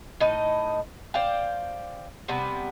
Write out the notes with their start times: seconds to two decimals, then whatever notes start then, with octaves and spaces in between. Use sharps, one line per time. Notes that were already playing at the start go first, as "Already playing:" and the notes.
0.20 A2 D#4 D#5
1.14 C5 D5 F5 G5
2.28 C3 G3 B3